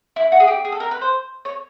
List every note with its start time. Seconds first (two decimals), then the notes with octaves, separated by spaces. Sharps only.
0.16 E4
0.32 F#4
0.40 G#4
0.47 G4
0.65 G#4
0.72 A4
0.80 A#4
0.91 B4
1.01 C5
1.45 C#5